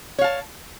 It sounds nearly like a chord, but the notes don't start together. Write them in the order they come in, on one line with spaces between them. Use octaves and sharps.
C#5 F5 A5